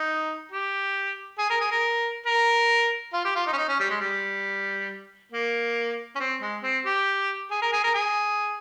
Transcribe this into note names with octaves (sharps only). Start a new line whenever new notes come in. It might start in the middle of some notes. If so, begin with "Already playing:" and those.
Already playing: D#4
G4
G#4
A#4
G#4
A#4
A#4
F4
G4
F4
D#4
C#4
D#4
C#4
G3
G#3
G3
A#3
C#4
C4
G#3
C4
G4
G#4
A#4
G#4
A#4
G#4